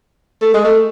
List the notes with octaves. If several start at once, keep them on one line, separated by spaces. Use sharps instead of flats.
A3
G#3
A3